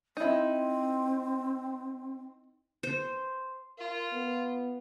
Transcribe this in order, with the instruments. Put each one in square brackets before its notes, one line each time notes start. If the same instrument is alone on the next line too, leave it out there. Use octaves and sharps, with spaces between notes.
[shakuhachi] C4 [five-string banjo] D#4 E4
[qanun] C5
[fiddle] F4 [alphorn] A#4
[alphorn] B3